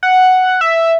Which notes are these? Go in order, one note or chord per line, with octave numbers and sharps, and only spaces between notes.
F#5
E5